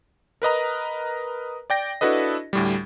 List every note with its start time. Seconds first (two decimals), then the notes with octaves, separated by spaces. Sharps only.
0.42 A#4 B4 D#5 A#5
1.70 D5 G5 A#6
2.01 D4 E4 F#4 A4 B4 D#5
2.53 D2 A2 G3